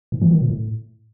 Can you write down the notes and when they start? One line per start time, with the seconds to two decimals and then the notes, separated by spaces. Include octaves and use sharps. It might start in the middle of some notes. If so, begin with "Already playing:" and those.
0.12 G#2
0.22 E3
0.31 D#3
0.40 A#2
0.50 A2